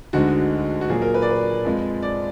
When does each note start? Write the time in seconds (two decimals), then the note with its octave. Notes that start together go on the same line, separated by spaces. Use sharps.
0.13 D2 D3 G#3 D#4 F#4
0.81 F#4
0.89 A#2 F#3 A#3 G#4
1.02 A#4
1.14 B4
1.22 D5
1.30 B4
1.65 F2 F3 G#3
2.03 D5